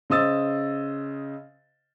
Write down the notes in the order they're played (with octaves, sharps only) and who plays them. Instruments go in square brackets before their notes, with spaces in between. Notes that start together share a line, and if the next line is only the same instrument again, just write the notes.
[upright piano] C#3 C5 D#5 D#6 E6 A6